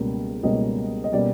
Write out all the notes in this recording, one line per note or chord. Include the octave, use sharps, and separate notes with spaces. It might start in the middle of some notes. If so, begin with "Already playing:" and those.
Already playing: C#2 B2 G3 A#3 C#4
C#2 B2 G3 A#3 C#4 D#5
D#5
B2 G3 A#3 C#4 D5